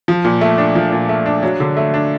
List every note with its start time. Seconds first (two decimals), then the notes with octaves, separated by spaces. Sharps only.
0.08 F3
0.25 A#2
0.41 A3
0.58 D4
0.75 F3
0.92 A#2
1.09 A3
1.26 D4
1.43 F#3
1.60 D3
1.77 A3
1.94 D4